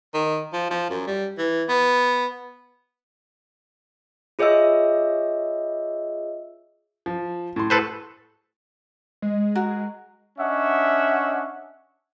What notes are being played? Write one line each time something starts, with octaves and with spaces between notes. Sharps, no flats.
D#3
F3
F3
F#2
G3
E3
B3
F4 G#4 C#5 D#5 E5 E6
F3
A2 C6
A4 B4 C5
G#3
F#4 A#4
C#4 D4 D#5 E5 F#5